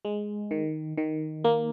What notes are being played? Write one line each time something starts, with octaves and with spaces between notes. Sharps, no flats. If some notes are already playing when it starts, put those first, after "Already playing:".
G#3
D#3
D#3
A#3